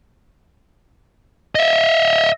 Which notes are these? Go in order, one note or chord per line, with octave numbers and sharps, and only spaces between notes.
D#5 E5